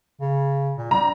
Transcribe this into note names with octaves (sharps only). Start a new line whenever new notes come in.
C#3
A#2
G3 A#5